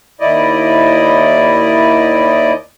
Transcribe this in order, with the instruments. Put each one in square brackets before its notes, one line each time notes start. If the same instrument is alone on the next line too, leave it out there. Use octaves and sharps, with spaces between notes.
[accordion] D#2 E4 D5 D#5